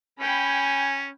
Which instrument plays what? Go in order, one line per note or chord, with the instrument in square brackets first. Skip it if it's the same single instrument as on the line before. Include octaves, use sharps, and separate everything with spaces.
[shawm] C#4 [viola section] G5 B5 [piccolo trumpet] G#5